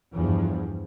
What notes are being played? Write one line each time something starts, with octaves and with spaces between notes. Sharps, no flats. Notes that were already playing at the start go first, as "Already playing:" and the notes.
E2 G2 F3